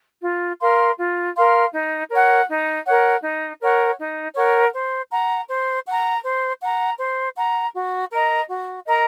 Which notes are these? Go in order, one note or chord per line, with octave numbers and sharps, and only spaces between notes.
F4
A#4 F5 C6
F4
A#4 F5 C6
D#4
A#4 C#5 F#5
D#4
A#4 C#5 F#5
D#4
A#4 C#5 F#5
D#4
A#4 C#5 F#5
C5
F#5 A#5
C5
F#5 A#5
C5
F#5 A#5
C5
F#5 A#5
F#4
A#4 D#5 A#5
F#4
A#4 D#5 A#5